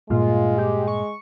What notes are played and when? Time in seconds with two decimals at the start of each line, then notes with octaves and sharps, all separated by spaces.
0.10 G2 A#2 G#3 F4
0.58 G4
0.88 C#6